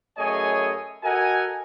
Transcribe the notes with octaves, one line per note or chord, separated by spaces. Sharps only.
F#2 A3 G#4 C#5 D#5 G#5
F#4 A4 A#4 D#5 F#5 G#5